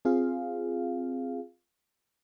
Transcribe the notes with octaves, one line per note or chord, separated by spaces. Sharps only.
C4 F4 G#4 F5